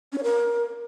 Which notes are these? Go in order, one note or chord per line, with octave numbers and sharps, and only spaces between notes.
C#4
C#5
A#4